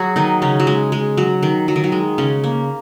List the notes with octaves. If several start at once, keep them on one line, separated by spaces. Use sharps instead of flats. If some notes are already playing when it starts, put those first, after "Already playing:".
Already playing: F#3 F#4 G#4
D#3 D#4
C#3 C#4
F#3
G#3
G#3
F#3
D#3
F#3
D#3
F#3
G#3
C#3 C#4
A#3